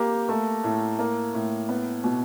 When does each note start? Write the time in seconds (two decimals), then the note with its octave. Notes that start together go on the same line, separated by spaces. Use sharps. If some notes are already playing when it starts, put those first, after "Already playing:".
Already playing: A#3 G4
0.29 A3
0.64 A2
0.99 A#3
1.34 A2
1.69 B3
2.04 B2